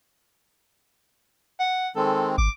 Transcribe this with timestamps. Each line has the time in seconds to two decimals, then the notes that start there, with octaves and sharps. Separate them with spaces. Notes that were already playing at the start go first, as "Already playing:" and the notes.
1.60 F#5
1.96 D#3 G#3 C4 A4
2.38 G#1 D6